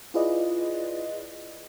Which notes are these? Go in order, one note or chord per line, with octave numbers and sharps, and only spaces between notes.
E4 F4 G#4 B4 D5 D#5